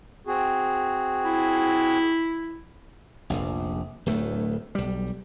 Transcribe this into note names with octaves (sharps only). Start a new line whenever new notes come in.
C4 F#4 G#4
E4
F1 A#1
D1 D2 A3
B1 G3